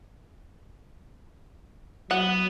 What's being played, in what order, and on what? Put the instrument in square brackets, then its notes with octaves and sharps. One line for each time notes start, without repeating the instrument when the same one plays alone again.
[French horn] F#3 [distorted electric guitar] B3 [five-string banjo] F#5